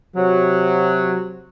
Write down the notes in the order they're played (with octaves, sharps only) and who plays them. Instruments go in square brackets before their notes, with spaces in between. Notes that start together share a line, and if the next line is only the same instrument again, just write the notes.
[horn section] C3 F#3